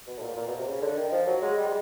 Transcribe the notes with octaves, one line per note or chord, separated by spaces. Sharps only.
B2
A2
A#2
A#2
B2
C3
C#3
D3
D#3
F3
F#3
G#3
G3
G#3